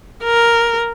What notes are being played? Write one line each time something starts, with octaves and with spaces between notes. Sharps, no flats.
A#4